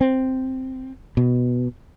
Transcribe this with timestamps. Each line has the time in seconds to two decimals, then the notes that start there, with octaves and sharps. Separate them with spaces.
0.01 C4
1.17 B2